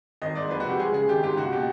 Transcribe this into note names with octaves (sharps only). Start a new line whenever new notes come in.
G#1 D#5
G#2 D5
F2 B4
F#4
C3 G4
G#3 G#4
C#3 G#4
G#1 G4
G#2 G4
C#2 F#4
B2 G4